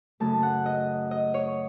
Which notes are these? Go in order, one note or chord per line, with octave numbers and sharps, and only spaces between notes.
F#2 C#3 A3 A5
F#5
D#5
D#5
C#5